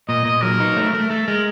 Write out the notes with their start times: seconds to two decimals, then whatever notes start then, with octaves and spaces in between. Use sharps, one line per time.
0.08 A#2 D#5
0.25 A#2 D#5
0.42 F#3 A#4
0.60 D#4
0.77 A3
0.93 A3 A#4
1.10 A3 A4
1.27 G#3 A#4